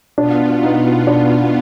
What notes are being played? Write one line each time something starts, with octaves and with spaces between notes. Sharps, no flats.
B2 B3 D4 F4
D#4
D4